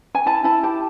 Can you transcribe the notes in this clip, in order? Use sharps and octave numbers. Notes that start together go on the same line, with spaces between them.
G#5
E4 A5
E4 A5
G4 A5